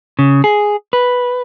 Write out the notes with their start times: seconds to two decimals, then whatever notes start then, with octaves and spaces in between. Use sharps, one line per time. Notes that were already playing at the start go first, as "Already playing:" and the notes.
0.19 C#3
0.44 G#4
0.93 B4